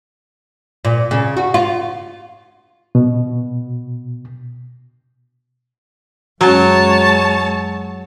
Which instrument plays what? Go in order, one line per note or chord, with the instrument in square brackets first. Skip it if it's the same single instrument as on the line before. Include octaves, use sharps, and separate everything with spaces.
[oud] A#2
C#3
F#4
F4
[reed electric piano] B2
[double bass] F#2 G#3 [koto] F#3 [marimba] C#4 F#4 [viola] C#5 A5